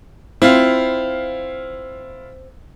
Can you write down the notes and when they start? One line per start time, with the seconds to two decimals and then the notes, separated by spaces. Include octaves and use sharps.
0.42 C4 E4 F4 F5